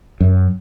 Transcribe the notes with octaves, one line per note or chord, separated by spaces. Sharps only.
F#2